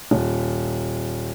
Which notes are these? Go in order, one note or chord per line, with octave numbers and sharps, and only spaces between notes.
D#1